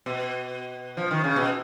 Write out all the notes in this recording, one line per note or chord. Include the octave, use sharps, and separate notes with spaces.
B2
F3
D#3
C#3
B2